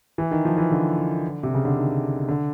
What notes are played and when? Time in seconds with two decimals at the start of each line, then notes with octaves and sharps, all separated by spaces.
0.18 E3
0.31 D#3
0.45 F3
0.58 E3
0.71 D3
1.43 C3
1.54 C#3
1.65 D3
1.76 D#3
2.29 D3